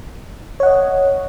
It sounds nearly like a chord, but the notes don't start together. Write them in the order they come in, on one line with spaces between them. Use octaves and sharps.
C#5 F#5 D#5